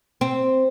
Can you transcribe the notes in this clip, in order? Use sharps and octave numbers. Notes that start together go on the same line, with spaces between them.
C4